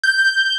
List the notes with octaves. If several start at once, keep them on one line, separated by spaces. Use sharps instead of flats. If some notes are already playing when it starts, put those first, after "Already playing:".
G6